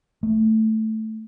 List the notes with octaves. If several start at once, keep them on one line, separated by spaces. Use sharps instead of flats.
A3